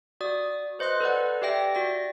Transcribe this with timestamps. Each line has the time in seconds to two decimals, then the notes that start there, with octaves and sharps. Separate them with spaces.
0.21 F#4 D5 D#6
0.79 B4 C5 D#5 C6 F#6
1.00 A4 B4 D5 F#5
1.42 G4 D5 E5 G5 A#6
1.75 F#4 D5 A#6